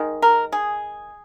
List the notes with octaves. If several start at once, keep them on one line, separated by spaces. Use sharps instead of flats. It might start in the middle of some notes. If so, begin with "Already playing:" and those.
Already playing: D#3 G#3
A#4
G#4